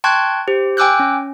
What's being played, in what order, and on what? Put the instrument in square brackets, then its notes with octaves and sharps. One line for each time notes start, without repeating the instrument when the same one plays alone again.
[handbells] G5 A5 C6 C#6 F#6 G#6
G4 C5
G5 G#5 D6 E6 F#6 G6
C#4